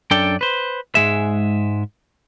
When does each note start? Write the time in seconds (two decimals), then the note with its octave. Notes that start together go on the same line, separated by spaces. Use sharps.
0.11 F#2 D4 A4 D5 G5
0.41 B4 C5
0.95 G#2 G#3 G#4 E5